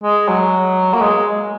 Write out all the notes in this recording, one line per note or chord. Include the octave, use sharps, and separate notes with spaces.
G#3
F#3
A#3
G#3